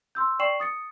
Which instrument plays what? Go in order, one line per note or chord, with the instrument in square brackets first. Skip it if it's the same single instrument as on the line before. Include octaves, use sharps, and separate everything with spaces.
[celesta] C6 E6 G6
D5 G5 C#6 C7 E7 F#7
D#6 A6 C#7